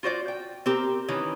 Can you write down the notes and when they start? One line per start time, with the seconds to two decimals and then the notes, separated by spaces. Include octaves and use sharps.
0.03 F4 F#4 C5 D5
0.28 G5
0.66 C4 G4 A#4
1.08 D#3 E3 C#4